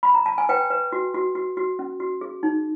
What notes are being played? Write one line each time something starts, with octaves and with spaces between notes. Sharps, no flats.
B5
A#5
A5
G#5
B4 G5
B4
F#4
F#4
F#4
F#4
C#4
F#4
G#4
D#4